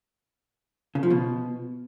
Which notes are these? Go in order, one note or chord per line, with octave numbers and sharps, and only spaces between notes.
C#3
F3
B2